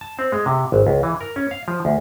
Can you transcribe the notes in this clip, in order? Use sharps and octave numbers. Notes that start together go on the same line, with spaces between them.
A5
C4
G#3
C3
G#1
C#2
E3
A#4
C#4
F5
F3
D2